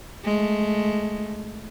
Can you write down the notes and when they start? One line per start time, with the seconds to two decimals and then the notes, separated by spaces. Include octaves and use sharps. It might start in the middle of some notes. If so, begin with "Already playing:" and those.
0.25 G#3 A3